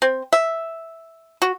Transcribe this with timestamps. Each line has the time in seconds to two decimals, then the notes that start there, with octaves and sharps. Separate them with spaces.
0.02 C4
0.33 E5
1.42 F#4